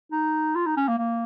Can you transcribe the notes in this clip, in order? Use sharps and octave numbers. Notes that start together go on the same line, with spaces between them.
D#4
F4
D#4
C#4
A#3
A#3